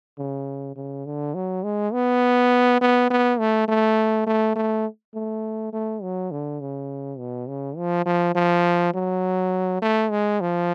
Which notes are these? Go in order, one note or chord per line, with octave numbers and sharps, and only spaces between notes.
C#3
C#3
D3
F#3
G#3
B3
B3
B3
A3
A3
A3
A3
A3
A3
F#3
D3
C#3
B2
C#3
F3
F3
F3
F#3
A3
G#3
F3